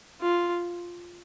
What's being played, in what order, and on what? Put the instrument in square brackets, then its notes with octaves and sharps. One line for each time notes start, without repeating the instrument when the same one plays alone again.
[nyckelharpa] F4